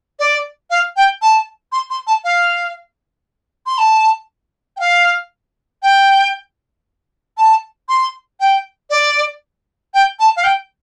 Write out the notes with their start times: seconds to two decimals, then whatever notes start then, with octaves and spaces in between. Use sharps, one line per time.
0.19 D5
0.70 F5
0.96 G5
1.22 A5
1.72 C6
1.90 C6
2.07 A5
2.24 F5
3.66 C6
3.78 A5
4.77 G5
4.80 F5
5.82 G5
7.37 A5
7.89 C6
8.40 G5
8.90 D5
9.94 G5
10.19 A5
10.37 F5
10.44 G5